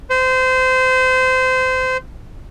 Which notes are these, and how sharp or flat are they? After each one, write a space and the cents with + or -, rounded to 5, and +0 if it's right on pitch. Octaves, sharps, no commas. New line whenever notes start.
C5 -25